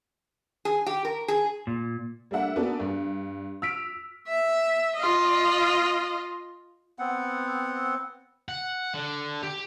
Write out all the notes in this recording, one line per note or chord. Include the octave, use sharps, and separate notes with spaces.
G#4
G4
A#4
G#4
A#2
G3 A3 A#3 D4 E5 F#5
A#3 B3 C#4 D4 F#4 A4
G2
E6 F6 B6 D7
E5
F4 D#5
B3 C4 F#5
F#5
D3
G4